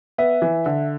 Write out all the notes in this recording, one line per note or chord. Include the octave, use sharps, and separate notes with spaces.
B3 E5
E3
D3